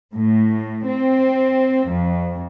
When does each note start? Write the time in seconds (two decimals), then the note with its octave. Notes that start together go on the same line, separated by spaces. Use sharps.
0.15 A2
0.89 C4
1.90 F2